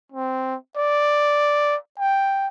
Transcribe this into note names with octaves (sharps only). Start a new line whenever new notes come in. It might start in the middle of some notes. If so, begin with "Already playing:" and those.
C4
D5
G5